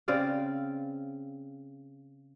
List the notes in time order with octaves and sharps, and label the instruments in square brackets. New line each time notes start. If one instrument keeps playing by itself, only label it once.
[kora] C#3 C4 D5 F5